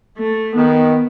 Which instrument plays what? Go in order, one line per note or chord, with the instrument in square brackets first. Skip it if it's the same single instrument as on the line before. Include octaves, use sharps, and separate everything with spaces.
[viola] A3
[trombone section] D#3 [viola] B3